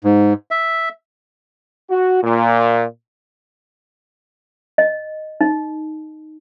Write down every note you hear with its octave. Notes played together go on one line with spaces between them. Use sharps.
G#2
E5
F#4
A#2
D#5
D#4